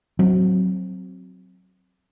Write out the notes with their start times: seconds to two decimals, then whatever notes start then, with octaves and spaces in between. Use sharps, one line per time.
0.19 F#3 C4